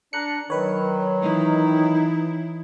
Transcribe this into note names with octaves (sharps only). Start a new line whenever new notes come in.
D4 A#5 F#6 C#7
D#3 F#3 B4 C#5
E3 D#4 E4